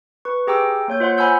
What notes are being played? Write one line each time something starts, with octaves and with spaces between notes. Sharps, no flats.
B4 C#6
G4 G#4 G5 A#5 D6 E6
A#3 C#5 G6
F4 C5 D#5 F#5 C6
C5 F#5 G#5 B5 E6 G6